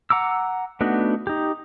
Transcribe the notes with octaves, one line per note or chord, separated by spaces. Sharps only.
F#5 A#5 D6 E6
A3 B3 D4 D#4 F#4
D#4 G4